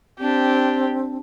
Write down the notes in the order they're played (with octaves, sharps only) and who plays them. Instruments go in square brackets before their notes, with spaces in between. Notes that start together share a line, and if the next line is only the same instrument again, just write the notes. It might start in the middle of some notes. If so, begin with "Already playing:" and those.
[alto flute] C4 [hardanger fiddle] D4 G4